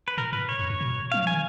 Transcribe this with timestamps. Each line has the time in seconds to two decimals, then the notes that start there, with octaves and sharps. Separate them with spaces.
0.08 B4
0.18 A#2 A#4
0.33 G#2 B4
0.49 C#5
0.59 F2
0.70 F#2
0.81 B2
1.12 F#3 F5
1.24 F3 G#5
1.33 D#3